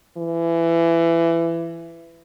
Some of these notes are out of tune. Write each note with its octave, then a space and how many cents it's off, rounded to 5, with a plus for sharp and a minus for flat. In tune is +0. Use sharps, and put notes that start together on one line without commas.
E3 +20